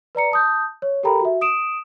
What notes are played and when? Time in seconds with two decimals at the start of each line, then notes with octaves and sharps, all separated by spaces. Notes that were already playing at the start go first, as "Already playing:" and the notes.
0.15 B4 D5 A#5 C#7
0.32 A5 D#6 G6
0.82 C#5
1.03 G4 A4 A#4 G5 A#5 B5
1.21 F#4 E5
1.41 D#6 D7 E7